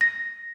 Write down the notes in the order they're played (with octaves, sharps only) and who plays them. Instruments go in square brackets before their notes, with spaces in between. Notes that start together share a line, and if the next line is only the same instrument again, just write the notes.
[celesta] A#6